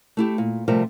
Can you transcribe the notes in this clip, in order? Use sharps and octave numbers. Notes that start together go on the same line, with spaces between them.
A3 E4 G4
A#2
C3 F3 G3 A3 F4 A#4